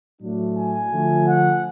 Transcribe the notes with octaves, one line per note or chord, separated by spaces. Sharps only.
A2 F#3 A3 D4
G#5
D3 F3 A3
F#5